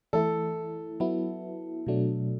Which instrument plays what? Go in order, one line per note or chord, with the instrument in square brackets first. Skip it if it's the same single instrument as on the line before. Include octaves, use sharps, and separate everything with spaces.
[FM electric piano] E3 A3 E4 [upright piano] A4
[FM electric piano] F#3 B3 E4
B2 F#3 A3 D4